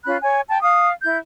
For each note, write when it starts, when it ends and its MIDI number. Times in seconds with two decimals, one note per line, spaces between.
0.05 0.17 61
0.05 0.17 65
0.05 0.17 83
0.05 0.17 90
0.23 0.41 73
0.23 0.41 80
0.48 0.61 79
0.48 0.61 81
0.61 0.90 77
0.61 0.90 87
1.03 1.17 64
1.03 1.17 91